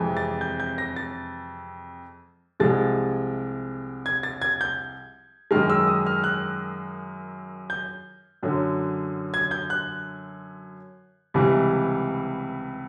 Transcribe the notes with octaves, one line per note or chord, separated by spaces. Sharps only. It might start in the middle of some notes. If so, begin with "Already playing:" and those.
Already playing: F2 C3 E3 G#3
A6
G6
G6
A#6
A6
C2 C3 F3 G#3 A6
G#6
A6
G#6
G6
F#2 D#3 G#3 F6
E6
D#6
F6
F#6
G6
F#2 D3 F#3
G#6
G6
F#6
C#2 C3 E3 G3